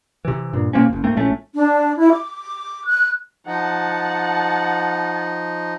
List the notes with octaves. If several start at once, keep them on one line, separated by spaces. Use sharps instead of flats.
C3 E3
G2 A#2
B2 A#3 C4 C#4
F#1 D#2
G#2 A3 A#3 C4
A#1 A2 A3 C#4
D4
E4
D6
F#6
F3 D#4 F#5 A5